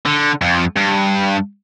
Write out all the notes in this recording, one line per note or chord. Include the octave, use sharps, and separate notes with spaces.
D3
F2
G2